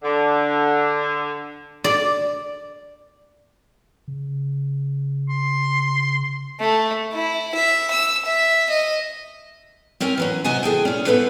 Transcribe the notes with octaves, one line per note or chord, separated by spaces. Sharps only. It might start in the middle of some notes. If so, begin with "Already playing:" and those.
D3
D5
C#3
C6
A3
E4
E5
E6
E5
D#5
C4 C#4 A#4 C#5 G#5
E3 F#3 C#4
C3 F#4 D#5 G#5
E3 G#4 A4 G5
A#2 C#4
B3 E4 A4 B4 C5